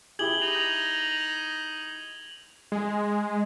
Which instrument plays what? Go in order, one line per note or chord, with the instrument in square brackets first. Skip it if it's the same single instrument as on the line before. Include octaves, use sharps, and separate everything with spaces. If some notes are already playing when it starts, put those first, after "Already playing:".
[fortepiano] E4 G4 G#4 [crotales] G#6 F#7 G7
[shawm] D#4 [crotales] F7 F#7
[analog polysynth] G#3